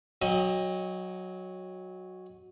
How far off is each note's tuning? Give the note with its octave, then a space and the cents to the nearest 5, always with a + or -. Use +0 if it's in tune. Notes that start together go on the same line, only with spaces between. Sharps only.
F#3 -5 D#5 +0 G5 +35